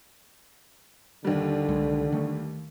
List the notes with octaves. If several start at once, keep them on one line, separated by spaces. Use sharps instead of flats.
D#2 D3 G3
C2 F#3 G#3
D#3 A3